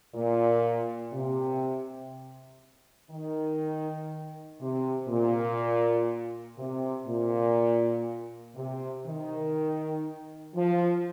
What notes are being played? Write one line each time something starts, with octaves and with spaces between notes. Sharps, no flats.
A#2
C3
D#3
C3
A#2
C3
A#2
C3
D#3
F3